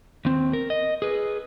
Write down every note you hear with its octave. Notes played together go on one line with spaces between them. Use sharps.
D#2 C4
A#4
D#5
G#4 B4